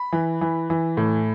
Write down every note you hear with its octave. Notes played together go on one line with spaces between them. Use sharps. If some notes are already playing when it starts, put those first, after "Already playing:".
Already playing: B5
E3
E3
E3
A2